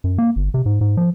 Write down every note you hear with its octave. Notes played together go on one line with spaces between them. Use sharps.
F#2
A#3
G1
C3
G#2
G#2
F3